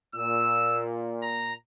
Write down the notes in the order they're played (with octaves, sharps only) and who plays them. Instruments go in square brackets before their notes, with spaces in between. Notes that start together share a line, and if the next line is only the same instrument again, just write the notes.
[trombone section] A#2 [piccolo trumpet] E6
[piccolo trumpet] A#5